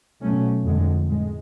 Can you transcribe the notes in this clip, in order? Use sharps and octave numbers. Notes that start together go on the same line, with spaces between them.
B2 F#3 A3 C#4
F2 D3 G#3
A2 G#3